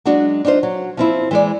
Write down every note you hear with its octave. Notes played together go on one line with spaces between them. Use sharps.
F#3 G#3 D4 F#4
D4 D#4 F4 C5
F#3
F3 C4 E4
E3 G#3 D5